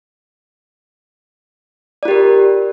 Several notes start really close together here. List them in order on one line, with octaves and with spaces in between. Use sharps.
D5 F4 G4 A#4